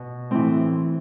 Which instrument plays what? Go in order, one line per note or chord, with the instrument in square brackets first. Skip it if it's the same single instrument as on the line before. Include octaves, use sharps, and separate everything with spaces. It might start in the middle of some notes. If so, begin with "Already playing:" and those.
Already playing: [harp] B2 B3
A2 E3 C4